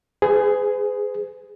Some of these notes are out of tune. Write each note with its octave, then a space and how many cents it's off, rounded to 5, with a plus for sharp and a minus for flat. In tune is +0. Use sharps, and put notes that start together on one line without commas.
G#4 +0 B4 +45